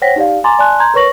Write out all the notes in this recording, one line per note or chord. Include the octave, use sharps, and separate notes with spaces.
C5 C#5 F#5 G5 A#6 B6
D#4 G4 D5 F5
G#5 A#5 C6 D6 A6
D5 G#5 A5 C6 F#6
A#5 C6 G6 G#6
A#4 B4 C#5 C#6 A#6 F#7